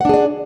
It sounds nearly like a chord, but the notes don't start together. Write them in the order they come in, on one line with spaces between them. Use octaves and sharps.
F#5 D4 G#4 D5